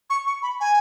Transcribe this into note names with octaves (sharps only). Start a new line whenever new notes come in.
C#6
C#6
B5
G#5